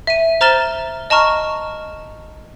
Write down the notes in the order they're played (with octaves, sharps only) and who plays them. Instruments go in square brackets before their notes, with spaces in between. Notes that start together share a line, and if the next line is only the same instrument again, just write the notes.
[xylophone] E5 D#7
C5 A#5 F6 A6 E7 G7
D#5 A5 A#5 C#6 F6